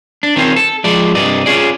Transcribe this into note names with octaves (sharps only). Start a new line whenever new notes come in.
D4
D#3 C4 C#4 F4
A4
F3 G#3 D5
C2 G2 D5 D#5
C#4 F4 G#4 D5